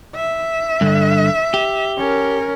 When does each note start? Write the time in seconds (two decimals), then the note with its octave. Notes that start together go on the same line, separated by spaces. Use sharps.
0.15 E5
0.81 G2 D3
1.54 G4
1.98 C#4 A#4